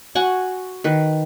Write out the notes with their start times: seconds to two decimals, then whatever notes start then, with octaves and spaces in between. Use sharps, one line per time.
0.15 F#4 F#5 G#5 C#6
0.84 D#3 B4